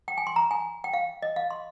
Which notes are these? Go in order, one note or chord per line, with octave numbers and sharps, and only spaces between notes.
G5
G#5
C6
A#5
G#5
G5
F5
D#5
F5
C6